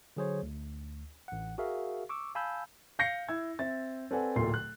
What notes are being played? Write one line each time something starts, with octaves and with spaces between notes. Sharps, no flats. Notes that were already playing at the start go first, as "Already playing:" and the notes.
D3 F#3 G#4 C5 C#5
D2
A1 F#5
F#4 G#4 A#4 E5 F5
C#6 D6 E6
F5 G#5 A5 B5 E6 G6
F5 G6 A#6 C7 C#7
E4 E6 G#6
C4 E5 A6
C4 A4 B4 D5 F#5 G#5
D1 A#2 A3 C6 C7
F#6